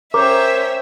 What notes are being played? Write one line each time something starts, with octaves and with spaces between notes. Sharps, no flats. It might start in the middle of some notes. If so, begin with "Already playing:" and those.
C#4 A#4 C5 C#5 E5 G5 D6